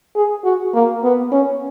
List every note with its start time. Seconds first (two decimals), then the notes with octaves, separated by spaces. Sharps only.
0.16 G#4
0.45 F#4
0.75 A#3
1.03 B3
1.32 C#4